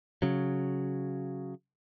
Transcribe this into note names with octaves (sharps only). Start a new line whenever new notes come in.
C#3 F#3